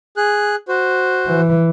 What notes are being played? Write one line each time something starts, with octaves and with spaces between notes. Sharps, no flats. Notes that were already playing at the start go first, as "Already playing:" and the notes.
G#4 F#6
F#4 C5
E3